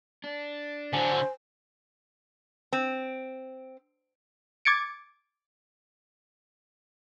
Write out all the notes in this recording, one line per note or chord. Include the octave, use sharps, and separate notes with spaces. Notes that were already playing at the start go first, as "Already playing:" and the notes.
D4
D3 F#3 C5 G#5
C4
D6 G#6 A6 C#7 D7